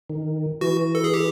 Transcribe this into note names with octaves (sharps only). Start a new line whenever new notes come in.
D#3
E3 F#4
A4
G#4
G4